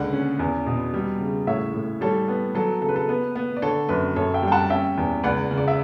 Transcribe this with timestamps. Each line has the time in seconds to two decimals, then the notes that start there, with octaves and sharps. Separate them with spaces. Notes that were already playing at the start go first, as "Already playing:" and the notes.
Already playing: C#2 D3 D5 F#5
0.13 C#4
0.39 E2
0.66 B2
0.94 G3
1.20 C#3
1.47 A2 C#5 E5
1.74 A2
2.01 G3 A4 C#5
2.28 B3
2.55 F#3 A4
2.81 C#3 A4
2.89 B4
2.96 A4
3.09 B3 B4
3.35 B3
3.57 D5
3.62 D3 A4 C#5
3.89 F#2 B4
4.16 F#2 A4 C#5
4.34 E5 G5
4.42 G3
4.47 G5
4.52 F#5 A5
4.70 C#4 E5 G5
4.97 E2
5.24 C#2 D5 F#5
5.51 C#3
5.57 D5
5.68 E5